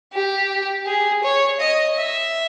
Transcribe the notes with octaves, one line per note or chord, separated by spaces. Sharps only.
G4
G#4
C#5
D#5
E5